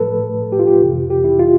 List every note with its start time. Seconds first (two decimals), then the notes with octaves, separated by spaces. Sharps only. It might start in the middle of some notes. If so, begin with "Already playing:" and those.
Already playing: A2 F3 A3 A4 B4
0.52 G4
0.59 F4
0.67 G4
0.81 F2 C3 E3
1.10 G4
1.24 E4
1.39 F4